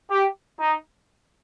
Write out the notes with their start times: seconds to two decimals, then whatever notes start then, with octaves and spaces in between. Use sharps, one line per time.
0.10 G4
0.60 D#4